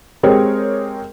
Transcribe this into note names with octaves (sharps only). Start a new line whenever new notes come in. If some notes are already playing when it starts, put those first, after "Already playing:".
G#3 C4 G4 G#4 A#4 C#5